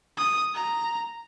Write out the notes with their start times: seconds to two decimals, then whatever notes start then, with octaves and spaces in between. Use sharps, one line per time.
0.17 D#6
0.55 A#5